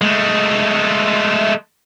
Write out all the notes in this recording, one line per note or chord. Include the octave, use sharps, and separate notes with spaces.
G#3 A3